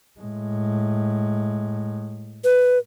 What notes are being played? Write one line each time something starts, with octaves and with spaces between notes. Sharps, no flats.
A2 G#3
B4